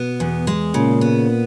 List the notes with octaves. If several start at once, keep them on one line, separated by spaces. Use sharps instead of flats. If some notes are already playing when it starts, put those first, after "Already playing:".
Already playing: B2 B3
E2
G#3
A#2 C#3
B3